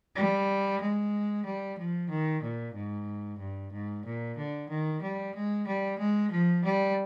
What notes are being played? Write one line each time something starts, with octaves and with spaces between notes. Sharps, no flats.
G3
G#3
G3
F3
D#3
A#2
G#2
G2
G#2
A#2
D3
D#3
G3
G#3
G3
G#3
F3
G3